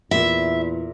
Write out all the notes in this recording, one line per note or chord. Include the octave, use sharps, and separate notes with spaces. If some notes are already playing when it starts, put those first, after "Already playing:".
E2 A#2 E4 E5